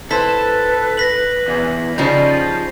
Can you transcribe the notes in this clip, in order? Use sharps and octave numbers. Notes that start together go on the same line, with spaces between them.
E4 A4 B4 C5 B6
A#6 B6 F#7
E2
C#3 F3 G3 C#4 D#4 G6 C7